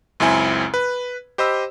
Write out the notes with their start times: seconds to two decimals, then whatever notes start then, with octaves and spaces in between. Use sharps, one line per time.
0.20 C#2 F#2 C4 E4 G#5
0.74 B4
1.38 G4 C5 D#5 B5 E6